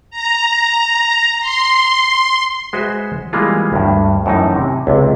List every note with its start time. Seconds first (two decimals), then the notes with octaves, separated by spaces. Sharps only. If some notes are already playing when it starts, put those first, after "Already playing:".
0.11 A#5
1.40 C6
2.73 G#3 F#4 B4 C5 E5
3.33 E3 G3 G#3 A#3 B3 F4
3.73 D2 G2
4.26 F#2 A2 E3 D#4
4.55 C3
4.87 C#2 C3